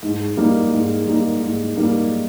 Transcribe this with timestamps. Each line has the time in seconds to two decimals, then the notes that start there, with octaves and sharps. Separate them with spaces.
0.03 G#2
0.37 G3 A#3 D#4
0.71 G#2
1.07 G3 A#3 D#4
1.41 G#2
1.76 G3 A#3 D#4